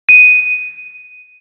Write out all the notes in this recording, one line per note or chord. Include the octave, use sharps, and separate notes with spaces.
D#7